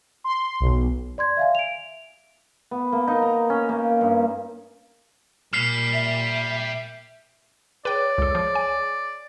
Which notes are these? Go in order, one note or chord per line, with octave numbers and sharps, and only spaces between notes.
C6
B1
D5 C6 G#6
E5 F5 G#5
D7 F7
B3
A#3
D#4
A#5
C#4
A#3
G2
A#2 G3 F6 C7
E5
G#4 B4 C#5 D5 G5
C#2 A4
F3
G#5